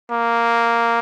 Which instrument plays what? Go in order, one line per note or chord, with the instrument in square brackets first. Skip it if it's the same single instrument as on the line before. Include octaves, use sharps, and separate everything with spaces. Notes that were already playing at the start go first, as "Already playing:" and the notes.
[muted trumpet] A#3